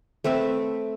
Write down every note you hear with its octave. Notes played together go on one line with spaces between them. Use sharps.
A3 C4 B4 E5